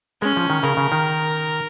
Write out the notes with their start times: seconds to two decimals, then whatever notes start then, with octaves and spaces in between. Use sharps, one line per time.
0.22 G#3 C#4
0.36 F3
0.50 D#3
0.63 C#3 A#4
0.77 C#3
0.92 D#3